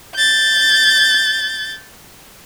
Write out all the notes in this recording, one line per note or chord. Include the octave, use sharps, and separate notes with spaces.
G6 A6